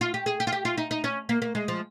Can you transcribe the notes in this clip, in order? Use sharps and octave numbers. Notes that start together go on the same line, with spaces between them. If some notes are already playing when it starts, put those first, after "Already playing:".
F4
G4
G#4
G4
F4
G4
F4
D#4
D#4
C#4
A#3
A#3
G#3
F3